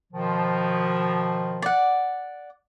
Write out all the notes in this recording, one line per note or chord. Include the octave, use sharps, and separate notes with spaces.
B2 D#3 F3
D5 F#5